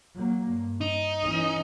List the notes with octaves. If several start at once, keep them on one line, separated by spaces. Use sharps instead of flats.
F#3 A#3
G2
D#4
E3 C#4